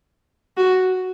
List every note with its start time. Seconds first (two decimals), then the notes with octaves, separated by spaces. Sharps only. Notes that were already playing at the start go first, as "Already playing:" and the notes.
0.57 F#4